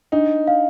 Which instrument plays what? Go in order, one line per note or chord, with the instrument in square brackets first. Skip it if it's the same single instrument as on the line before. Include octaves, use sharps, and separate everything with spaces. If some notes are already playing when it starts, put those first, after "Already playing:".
[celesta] D4 [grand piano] D#4
[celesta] F5